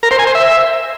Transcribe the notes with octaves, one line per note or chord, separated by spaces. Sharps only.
A#4
C5
G#5
C5
E5